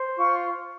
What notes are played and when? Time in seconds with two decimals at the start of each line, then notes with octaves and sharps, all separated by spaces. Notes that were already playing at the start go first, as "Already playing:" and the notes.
Already playing: C5
0.16 F4 C#6